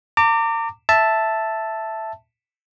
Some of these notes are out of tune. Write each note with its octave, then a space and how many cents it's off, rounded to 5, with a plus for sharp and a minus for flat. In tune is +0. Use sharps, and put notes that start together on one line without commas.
A#5 -40 D6 +0
E5 +0 A5 +0